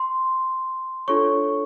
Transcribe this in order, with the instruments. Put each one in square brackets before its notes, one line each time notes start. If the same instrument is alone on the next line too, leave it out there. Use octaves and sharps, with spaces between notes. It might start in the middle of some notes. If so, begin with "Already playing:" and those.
Already playing: [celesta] C6
D4 F4 A4 C#5 C#6